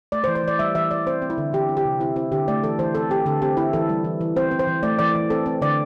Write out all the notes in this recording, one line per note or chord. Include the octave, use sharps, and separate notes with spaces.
A3 D5
C5
E3
C5
E3 D5
G3 E5
E3 E5
E3 D5
C4 C5
C4
E4
D3
E3 G4
C4
G4
C3
C4 E4
C4 E4
D3 G4
A3 D5
E3 A4
E3 C5
C4 A4
C4 G4
D3 A4
C4 G4
C4 E4
E3 A4
G3
E3
E3
C4 C5
C4
C5
E3
A3 D5
E3 D5
E3
C4 A4
C4
D3 D5